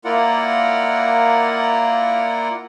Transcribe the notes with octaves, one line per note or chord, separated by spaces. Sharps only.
A#3 E4 F4 A#4 D5 F#5